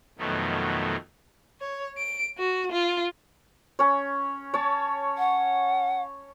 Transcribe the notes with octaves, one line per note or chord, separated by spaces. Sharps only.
F2 B2 D#3 F#3 A3
C#5
D7
F#4
F4
C#4 C#5
C#5 A5
F#5